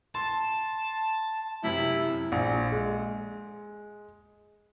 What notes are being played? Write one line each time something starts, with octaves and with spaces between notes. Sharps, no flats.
A5 C6
F#2 C3 E4
A#1
G#3